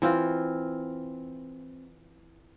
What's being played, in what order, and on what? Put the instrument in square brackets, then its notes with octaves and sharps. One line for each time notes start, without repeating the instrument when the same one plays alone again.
[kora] E3 C4 F4